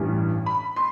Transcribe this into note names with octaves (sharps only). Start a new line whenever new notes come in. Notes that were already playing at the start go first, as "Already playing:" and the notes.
Already playing: A1 G2 E3 G3
B5
C6